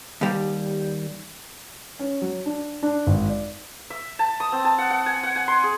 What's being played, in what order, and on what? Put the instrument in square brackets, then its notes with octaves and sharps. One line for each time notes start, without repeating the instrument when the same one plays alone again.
[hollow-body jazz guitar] D#2 G3
[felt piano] C#4
F#3
D4
D4
G#1
D5
[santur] E5
A5
D#6
C4
A5
F#5
F#5
G#5
F#5
G#5
C6
G#4